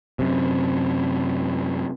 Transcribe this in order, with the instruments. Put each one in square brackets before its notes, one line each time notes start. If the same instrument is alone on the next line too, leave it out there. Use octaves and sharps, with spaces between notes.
[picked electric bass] F#2 C3